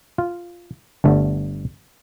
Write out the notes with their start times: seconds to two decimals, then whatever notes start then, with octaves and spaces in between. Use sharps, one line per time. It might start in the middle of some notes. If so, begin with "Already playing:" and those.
0.18 F4
1.04 G1 G2 D3 A3